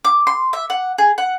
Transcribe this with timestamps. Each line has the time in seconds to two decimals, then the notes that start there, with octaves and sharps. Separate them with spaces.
0.04 D6
0.27 C6
0.53 E5
0.70 F#5
0.98 G#4
1.18 F#5